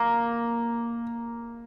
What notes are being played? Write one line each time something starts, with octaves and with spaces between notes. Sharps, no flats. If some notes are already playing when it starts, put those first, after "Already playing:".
Already playing: A#3